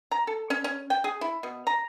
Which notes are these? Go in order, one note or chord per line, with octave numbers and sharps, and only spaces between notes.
A#5
A4
C#4
C#4
G5
G#4
E4
B2
A#5